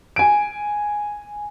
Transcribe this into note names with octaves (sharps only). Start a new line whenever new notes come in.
G#5 D7